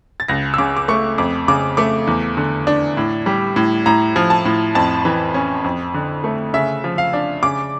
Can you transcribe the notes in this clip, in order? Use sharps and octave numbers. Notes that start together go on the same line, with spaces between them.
A6
C#2 A#6
E6
C#3 D6
D6
A3 C#6
F2 D6
C#3 D6
A3 D6
E2
D3
D4
A2
G3
A2
A2 A#5
F3
A5
A2
F2 A5
E3
C#4
F2
D3
A3
C#3 E5
F3
F5
D4
C#3 D6